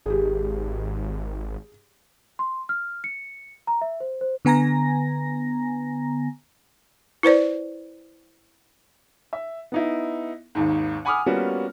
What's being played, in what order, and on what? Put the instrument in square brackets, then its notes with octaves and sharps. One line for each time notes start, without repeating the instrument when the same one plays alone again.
[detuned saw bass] G#1 [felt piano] G4 G#4
[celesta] C6
F6
C#7
A#5
E5
C5
C5
[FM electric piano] D3 B3 G#5 A#5 A#6
[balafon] E4 B4 C5 D5
[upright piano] E5
B3 D#4 E4
G#1 D#2 G#2
F#5 G#5 B5 D6 D#6 F6
G3 A#3 B3 C#4 F4 F#4